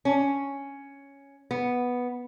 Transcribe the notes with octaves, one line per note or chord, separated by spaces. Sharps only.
C#4
B3